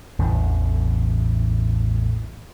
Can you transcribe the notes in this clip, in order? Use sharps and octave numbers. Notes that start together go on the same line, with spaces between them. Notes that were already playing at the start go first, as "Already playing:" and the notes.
A1 E2 A2 D3